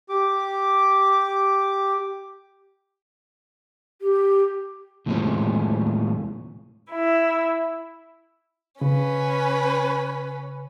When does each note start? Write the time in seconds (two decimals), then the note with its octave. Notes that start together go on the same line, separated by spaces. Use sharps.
0.09 G4 D6
4.01 G4
5.06 D#2 A2 C3 F3 G#3 C#4
6.91 E4
8.81 C#3 C#4 B4